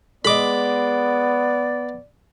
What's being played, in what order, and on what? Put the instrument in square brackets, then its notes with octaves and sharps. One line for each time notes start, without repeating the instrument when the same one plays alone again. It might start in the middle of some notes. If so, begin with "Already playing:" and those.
[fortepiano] G#3 D#5 [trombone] B3 [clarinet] D5 [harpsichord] B5 D6